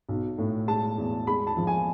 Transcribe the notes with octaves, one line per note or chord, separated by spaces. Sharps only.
B1
A2
G#3 A5
E2
G#3 B5
A5
F3
G#5